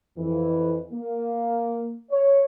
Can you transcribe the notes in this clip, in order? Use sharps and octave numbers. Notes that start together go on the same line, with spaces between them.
F2 E3
A#3
C#5